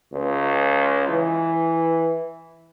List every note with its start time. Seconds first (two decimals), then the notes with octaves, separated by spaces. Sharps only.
0.12 C#2
1.09 E3